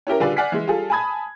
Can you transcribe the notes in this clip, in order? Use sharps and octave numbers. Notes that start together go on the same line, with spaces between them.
C#4 E4 G4 A#4
D3 G3 F4 G#4 B4 D5
D5 F#5 G#5 F6 B6 C7
E3 G#3
G3 F4 G#4 A4
G#5 A5 B5 D#6 G#6